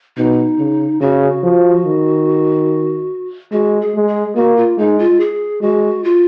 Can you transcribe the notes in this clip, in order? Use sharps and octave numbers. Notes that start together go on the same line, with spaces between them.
B2 D#4
C#3
C#3 F#4
F3
D#3
G#3 F#4
G#4
G#3
G#4
A#3 F#4
F4
G#3 D#4
F4
G#4
G#3 F#4
F4